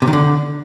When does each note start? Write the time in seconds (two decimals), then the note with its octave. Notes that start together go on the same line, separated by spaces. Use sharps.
0.02 C3
0.07 D#3
0.13 D3